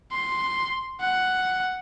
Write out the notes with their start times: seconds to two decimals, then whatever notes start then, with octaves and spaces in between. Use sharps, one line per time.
0.12 C6
1.00 F#5